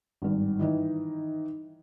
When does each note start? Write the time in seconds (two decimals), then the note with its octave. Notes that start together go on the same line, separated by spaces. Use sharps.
0.22 G#1 G2
0.59 D#3 E3 D#4